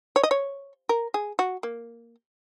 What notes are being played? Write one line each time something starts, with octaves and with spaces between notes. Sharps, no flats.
C#5
D#5
C#5
A#4
G#4
F#4
A#3